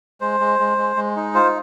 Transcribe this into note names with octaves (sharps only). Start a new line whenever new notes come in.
G#3 C5
G#3
G#3
G#3
G#3
D#4
F4 C5